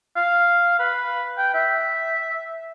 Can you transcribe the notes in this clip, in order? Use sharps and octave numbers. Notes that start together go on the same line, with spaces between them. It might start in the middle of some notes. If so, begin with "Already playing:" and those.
F5
B4
G5
E5